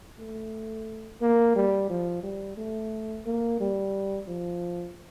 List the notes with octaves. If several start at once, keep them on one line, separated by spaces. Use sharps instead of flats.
A3
A#3
G3
F3
G3
A3
A#3
G3
F3